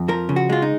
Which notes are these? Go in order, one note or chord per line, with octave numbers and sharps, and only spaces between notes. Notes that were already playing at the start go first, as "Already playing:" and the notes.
Already playing: F2
F3 A#4
C#3
F#4
G#3 F4
D#4